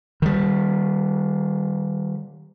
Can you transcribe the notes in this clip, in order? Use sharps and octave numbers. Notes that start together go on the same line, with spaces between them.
D#3 G3